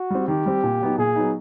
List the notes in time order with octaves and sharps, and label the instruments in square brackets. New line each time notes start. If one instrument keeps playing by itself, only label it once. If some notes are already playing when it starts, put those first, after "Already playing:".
Already playing: [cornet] F#4
[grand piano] G3 C4
[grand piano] D#3 [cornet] G4
[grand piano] G3 C4
A#2
F#3 B3 D#4
[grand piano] A#2 [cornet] G#4
[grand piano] F#3 B3 D#4